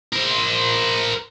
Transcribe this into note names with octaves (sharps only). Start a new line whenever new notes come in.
A#4 C5